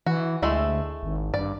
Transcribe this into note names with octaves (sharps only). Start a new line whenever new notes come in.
E3 F#4
D2 G#3 A3 E4
G#1
G2 D5